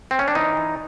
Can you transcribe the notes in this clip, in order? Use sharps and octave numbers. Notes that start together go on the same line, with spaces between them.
C4
C#4
D4
E3 D#4
E3